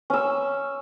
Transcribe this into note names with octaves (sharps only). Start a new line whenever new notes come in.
C#4 E6